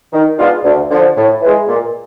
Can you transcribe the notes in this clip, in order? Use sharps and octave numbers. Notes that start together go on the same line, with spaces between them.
D#3
G#3 B3 D4 F4
D2
D3 F3
A2
E3 G#3
A#2